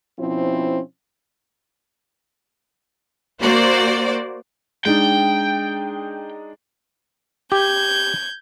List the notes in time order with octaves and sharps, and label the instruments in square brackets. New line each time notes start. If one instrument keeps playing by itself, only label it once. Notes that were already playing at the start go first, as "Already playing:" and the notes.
[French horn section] B2 F3 C4 C#4 E4
[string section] A#3 F#4 C5 D5
[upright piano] G#3 D4 D#4 [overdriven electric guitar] G5
[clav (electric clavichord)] G4 [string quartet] G6 G#6